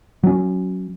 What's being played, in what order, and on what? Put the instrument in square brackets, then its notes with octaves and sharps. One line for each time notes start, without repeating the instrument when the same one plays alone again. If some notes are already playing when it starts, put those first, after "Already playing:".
[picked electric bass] F#3 C#4